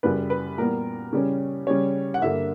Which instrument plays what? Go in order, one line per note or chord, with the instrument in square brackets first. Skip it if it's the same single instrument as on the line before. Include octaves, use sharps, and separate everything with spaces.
[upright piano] F#2 C#3 G3 B4
B4
A#2 G3 B3 A#4
C#3 G3 C#4
C#3 G3 C#4 C#5
F#5
G2 D3 A#3 E5